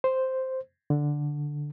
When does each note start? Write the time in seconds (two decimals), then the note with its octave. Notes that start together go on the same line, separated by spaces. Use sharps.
0.04 C5
0.90 D3